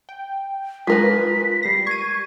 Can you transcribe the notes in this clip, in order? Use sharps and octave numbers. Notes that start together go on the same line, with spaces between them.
G5
G#3 F4 A#4 B4 B6
G3 A#6 C7
C#6 G#6 D#7